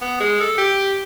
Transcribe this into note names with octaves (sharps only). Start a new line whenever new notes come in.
B3
G#3
A4
G4